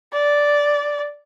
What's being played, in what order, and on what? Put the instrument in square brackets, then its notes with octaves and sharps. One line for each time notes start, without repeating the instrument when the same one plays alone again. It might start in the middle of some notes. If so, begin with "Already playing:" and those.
[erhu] D5